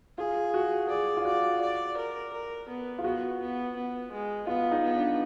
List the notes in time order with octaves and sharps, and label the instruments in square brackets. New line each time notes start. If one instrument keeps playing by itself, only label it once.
[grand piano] F4 [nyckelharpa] G#4
[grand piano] F#4
[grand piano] G#4 [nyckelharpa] D5
[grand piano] F4
[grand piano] F#4 [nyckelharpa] D5
[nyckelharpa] D5
A#4
A#4
B3
[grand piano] F4
[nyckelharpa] B3 [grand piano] F#4
[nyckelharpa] B3
B3
G#3
[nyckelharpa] B3 [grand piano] F4
[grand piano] D#4
[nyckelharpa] B3
[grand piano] D4